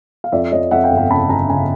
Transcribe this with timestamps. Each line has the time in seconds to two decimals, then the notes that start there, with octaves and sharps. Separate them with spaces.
0.24 F5
0.32 F2 D5 E5
0.52 F2 C#5 D#5
0.71 F2 E5 F#5
0.84 F5 G5
0.91 G1
0.97 F5 G5
1.10 C#3 A5 B5
1.29 G1 G#5 A#5
1.49 C#3 G#5 A#5